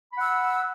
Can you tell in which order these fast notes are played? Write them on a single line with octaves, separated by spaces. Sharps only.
B5 F#5 E6